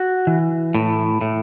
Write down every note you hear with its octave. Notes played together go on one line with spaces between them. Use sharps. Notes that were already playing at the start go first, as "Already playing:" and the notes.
Already playing: F#4
E3
A2
A2